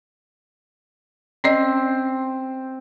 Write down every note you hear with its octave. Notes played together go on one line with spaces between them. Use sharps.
C4 C#4 D5 D#5